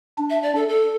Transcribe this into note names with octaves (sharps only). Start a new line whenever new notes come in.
D4
E5
D5
A4
A4